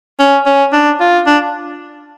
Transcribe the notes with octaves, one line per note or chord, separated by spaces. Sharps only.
C#4
C#4
D4
F4
D4